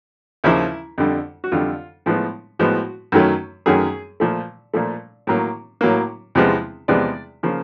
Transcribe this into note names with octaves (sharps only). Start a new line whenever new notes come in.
D#2 C#3 F3 E4
F2 D3 G3
F#4
F2 D3 G3 F4
A2 F3 G#3 B3
A2 F3 G#3 B3 F#4
F#2 D#3 F#3 A3
F#2 D#3 F#3 A3 G#4
A#2 F3 A3
A#2 F3 A3
A2 F#3 A#3
A2 F#3 A#3
E2 C3 F3 G#3 B3
E2 C3 F3 G#3 B3 D5
C#3 F3 A#3